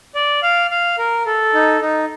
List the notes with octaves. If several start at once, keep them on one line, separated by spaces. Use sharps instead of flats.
D5
F5
F5
A#4
A4
D#4
D#4